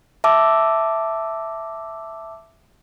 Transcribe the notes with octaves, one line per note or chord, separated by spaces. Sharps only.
E5 A5 D6 E6